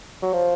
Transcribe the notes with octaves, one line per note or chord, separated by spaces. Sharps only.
F#3
F3